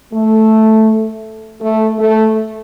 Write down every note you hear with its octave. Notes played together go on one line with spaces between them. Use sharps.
A3
A3
A3